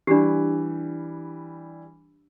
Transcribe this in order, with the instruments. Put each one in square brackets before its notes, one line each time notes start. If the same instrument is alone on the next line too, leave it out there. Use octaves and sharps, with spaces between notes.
[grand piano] E3 G3 [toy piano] D4 G4